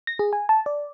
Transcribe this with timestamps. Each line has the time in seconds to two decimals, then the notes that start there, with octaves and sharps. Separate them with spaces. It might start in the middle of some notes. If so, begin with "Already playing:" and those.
0.07 A#6
0.19 G#4
0.33 G#5
0.49 A5
0.66 D5